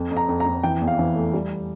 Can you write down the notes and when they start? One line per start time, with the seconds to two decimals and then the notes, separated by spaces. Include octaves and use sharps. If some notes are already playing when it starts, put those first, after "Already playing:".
Already playing: F2
0.12 F2
0.17 A#5
0.29 F2
0.40 A#5
0.46 F2
0.63 E3 G5
0.81 E2
0.88 F5
0.99 E3
1.16 A3
1.33 G3